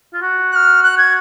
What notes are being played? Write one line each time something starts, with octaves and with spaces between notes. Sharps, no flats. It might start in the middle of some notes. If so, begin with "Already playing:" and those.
F4
F#4
F#6
F6
F#6
G#6